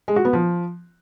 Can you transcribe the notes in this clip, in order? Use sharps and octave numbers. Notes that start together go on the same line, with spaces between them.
G#3
F#4
B3
F3